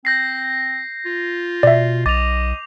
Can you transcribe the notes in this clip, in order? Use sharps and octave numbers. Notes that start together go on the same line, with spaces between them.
C4 G6 A#6 C7
F4
B2 D5 E5
B1 D#5 D6 A6 F7